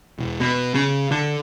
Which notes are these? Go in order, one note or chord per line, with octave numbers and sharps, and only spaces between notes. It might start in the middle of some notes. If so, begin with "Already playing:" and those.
E1
B2
C#3
D3